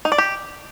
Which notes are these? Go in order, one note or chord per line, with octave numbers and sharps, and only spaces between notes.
D#4
D5
G4